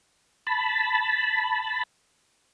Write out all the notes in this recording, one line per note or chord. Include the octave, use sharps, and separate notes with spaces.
A5 B5